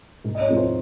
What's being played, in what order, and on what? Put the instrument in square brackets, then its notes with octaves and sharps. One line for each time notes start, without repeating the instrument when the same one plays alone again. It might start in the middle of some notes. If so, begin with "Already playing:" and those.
[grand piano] G#2
D#5
C#5
F3 G#3 C4 D#4
C5